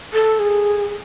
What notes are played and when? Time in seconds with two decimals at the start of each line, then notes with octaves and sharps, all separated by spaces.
0.13 A4
0.39 G#4